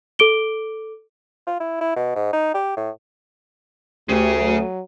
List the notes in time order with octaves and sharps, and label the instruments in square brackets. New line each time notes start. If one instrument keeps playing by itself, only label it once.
[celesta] A4 D6 D7 G7
[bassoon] F4
E4
E4
B2
G#2
D#4
G4
A2
[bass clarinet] D2 [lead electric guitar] C#3 G#4 [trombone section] A3 [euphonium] G4
[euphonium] F#3